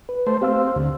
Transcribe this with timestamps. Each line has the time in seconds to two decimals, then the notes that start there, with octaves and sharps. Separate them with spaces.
0.09 B4
0.26 A3 C5
0.42 C4 G4 F5 E6
0.75 D2